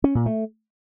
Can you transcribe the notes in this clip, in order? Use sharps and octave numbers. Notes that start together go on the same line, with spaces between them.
C#4
A#2
A3